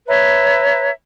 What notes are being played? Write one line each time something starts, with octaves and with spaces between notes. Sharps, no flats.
B4 C#5 E5 A#5